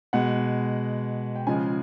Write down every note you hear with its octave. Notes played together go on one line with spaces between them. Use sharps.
B2 G#3 F#5
G5
C#3 F3 G#3 G#5